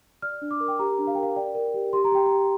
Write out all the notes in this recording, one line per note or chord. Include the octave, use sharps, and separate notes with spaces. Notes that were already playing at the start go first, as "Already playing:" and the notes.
D5 F6
D4
D6
A#4
G5
G4 A#5
D4
F5
G5
A#4
F5
D5 G5
A#4
G4
G4 C6
A#5
G4 G5
G4 A#5